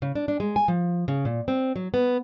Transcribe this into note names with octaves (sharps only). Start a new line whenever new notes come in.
C#3
D4
D4
G#3
G#5
F3
C#3
A#2
C4
F#3
B3